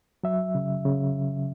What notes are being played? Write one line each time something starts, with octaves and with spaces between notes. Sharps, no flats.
F#3 E5
C#3
C#3